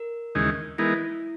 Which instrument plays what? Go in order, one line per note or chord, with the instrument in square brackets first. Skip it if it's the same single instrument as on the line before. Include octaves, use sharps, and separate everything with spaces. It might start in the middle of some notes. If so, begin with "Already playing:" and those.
Already playing: [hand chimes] A#4
[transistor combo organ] D#2 C#3 E3 G#3 D#4
[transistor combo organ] E3 G#3 B3 D#4 A#4 [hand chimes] E4